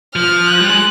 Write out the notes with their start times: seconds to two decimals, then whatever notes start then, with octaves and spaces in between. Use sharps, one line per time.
0.15 F3 F6
0.46 F#6
0.61 G3
0.69 G#3